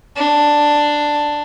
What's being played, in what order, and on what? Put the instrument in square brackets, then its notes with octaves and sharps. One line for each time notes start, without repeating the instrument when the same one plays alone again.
[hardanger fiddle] D4